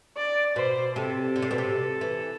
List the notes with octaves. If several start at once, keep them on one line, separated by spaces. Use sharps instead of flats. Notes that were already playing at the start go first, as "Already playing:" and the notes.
D5
B2 C5
C3 A4
D3
C3
B2
C3
E3